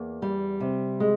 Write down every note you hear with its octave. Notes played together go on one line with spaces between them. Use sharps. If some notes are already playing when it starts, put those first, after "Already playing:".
Already playing: E2 A#3
G3
C3
G#3